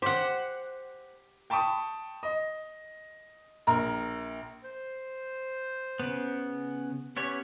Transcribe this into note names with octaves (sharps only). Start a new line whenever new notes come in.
G4 C5 F#5
G5 A5 B5 C#6 D#6
D#5
A#1 A#4 A#5
C5
C#3 B3
B3 C#4 G4 C#5